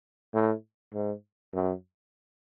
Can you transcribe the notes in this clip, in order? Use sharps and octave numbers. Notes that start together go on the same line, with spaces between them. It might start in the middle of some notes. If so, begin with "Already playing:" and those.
A2
G#2
F#2